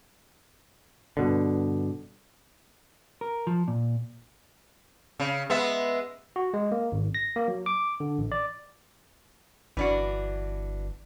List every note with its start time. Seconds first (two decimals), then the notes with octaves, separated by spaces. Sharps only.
1.17 G2 B2 D3
3.21 A#4
3.47 F3
3.68 A#2
5.20 C#3
5.50 G#3 B3 E5
6.36 F#4
6.54 G#3
6.72 A#3
6.92 G#1
7.15 A#6
7.36 A#3
7.48 F#3
7.66 D6
8.00 D3
8.18 A1
8.32 D5
9.77 G1 E3 D4 F#4